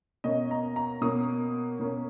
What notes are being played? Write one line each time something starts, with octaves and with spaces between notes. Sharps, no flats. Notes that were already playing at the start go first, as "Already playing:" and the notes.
B2 A#3 C#4 D#5
A#5
A#5
B2 A#3 C#4 D#6
B2 A#3 C#4